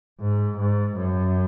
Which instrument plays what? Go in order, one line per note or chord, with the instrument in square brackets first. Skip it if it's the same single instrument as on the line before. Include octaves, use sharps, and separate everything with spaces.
[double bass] G#2
G#2
F#2